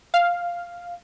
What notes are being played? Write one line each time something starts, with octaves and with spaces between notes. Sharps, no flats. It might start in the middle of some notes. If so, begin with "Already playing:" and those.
F5